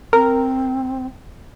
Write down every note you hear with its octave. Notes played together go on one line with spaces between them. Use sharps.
C4 A#4